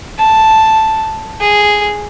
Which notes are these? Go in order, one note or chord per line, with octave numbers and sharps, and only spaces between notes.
A5
G#4